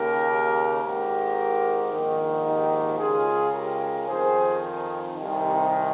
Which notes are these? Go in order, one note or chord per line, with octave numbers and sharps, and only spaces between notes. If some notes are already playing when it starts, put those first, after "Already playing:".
Already playing: D#2 C#3 G4 A#4
G#1 G#2 D#3 G4 A#4
A#1 G#2 D#3
D#4 G4
C#2 C#3 F4 G#4
G4 A#4
F2 D#3 G#4 C5
C2 C3 D#3